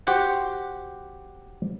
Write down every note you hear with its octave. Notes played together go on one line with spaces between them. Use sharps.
F#4 G4 C5 F#5 G5